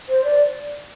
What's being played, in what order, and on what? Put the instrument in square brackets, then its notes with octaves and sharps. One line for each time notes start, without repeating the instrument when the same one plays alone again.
[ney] C5
D5